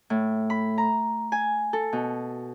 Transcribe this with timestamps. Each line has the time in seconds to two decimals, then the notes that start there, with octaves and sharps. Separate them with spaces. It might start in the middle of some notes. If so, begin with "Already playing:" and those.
0.10 A2
0.50 B5
0.78 A#5
1.32 G#5
1.73 A4
1.93 B2